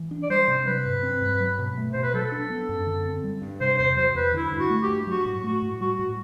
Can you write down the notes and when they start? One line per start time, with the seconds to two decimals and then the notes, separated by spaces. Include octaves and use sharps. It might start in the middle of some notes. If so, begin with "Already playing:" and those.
Already playing: E3
0.11 D4
0.23 D5
0.30 G3 C5
0.48 C3
0.67 F#3 B4
0.85 G2
1.03 C4
1.22 G2
1.40 F#3
1.59 B2
1.77 A3
1.93 B2 C5
2.03 B4
2.14 F#3 A4
2.32 D4
2.50 B3
2.69 F#2
2.87 D3
3.06 C4
3.24 G3
3.42 G2
3.60 C3 C5
3.78 E2 C5
3.96 F#3 C5
4.15 E2 B4
4.34 D3 E4
4.52 G2
4.58 F#4
4.70 A3
4.82 G4
4.89 G2
5.07 F#3 F#4
5.26 A2
5.43 A3 F#4
5.62 A2
5.80 G3 F#4
5.98 A2 F#4